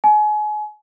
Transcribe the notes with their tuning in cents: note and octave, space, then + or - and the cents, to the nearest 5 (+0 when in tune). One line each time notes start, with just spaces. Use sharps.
G#5 +30